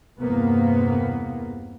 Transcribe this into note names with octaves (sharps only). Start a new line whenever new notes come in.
E2 G2 C3 A#3 B3